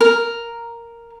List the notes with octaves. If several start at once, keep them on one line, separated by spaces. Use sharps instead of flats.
A#4